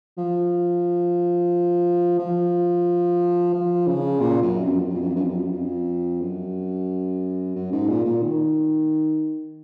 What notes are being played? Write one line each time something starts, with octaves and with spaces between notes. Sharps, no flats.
F3
F3
F3
C#3
A#2
F#2
F2
F#2
F2
F#2
F2
F#2
F2
F#2
F2
F#2
F2
F#2
F2
F#2
F#2
G#2
A#2
A#2
D#3